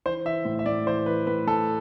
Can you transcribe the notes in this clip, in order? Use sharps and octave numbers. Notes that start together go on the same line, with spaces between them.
E3 C5
E3 E5
A2
E5
A2 D5
E3 C5
E3 B4
A2 B4
A2 A4